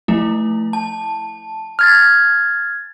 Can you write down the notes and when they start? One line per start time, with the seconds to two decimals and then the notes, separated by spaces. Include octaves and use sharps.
0.08 F3 A3 E4
0.73 A5
1.79 F6 G#6 A6